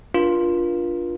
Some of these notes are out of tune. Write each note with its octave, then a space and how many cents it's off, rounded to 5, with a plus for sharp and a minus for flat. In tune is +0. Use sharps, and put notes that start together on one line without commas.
D4 +0 F4 +0 A#4 +40